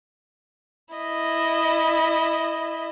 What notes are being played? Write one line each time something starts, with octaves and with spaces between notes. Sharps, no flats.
E4 D#5